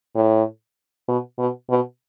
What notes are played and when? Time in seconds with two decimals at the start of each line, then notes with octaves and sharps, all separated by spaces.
0.15 A2
1.09 B2
1.39 B2
1.70 B2